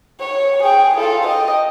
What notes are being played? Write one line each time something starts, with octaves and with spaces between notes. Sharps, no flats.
C#5
G#4 G5
F4 A4
D#5 G5